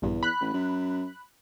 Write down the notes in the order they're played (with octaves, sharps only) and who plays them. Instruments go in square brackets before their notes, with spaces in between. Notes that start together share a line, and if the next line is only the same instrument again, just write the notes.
[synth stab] A#1 G2 [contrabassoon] E2
[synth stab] B5 F#6
[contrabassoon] A1
F#2